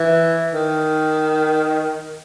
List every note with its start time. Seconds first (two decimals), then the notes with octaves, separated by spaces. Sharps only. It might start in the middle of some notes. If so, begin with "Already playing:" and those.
Already playing: E3
0.54 D#3